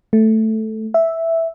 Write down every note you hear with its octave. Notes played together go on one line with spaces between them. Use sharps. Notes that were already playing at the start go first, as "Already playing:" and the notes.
A3
E5